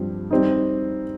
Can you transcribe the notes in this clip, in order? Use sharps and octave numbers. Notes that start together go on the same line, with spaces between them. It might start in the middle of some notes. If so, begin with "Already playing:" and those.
Already playing: G2 F3 C4 G4
G3 C4 D#4